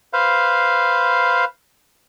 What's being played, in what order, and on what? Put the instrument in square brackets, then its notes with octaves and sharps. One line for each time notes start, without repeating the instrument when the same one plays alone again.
[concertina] B4 C5 F5